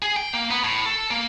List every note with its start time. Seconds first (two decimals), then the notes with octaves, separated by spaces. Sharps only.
0.02 G#4
0.17 G5
0.34 A#3
0.51 B3
0.64 A2
0.86 A4
1.11 A#3